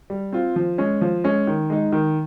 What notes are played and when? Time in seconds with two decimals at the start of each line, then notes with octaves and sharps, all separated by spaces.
0.10 G3
0.32 C4 F4
0.56 F3
0.78 G#3 C#4
1.01 F3
1.24 G#3 C#4
1.47 D#3
1.70 G#3 D#4
1.92 D#3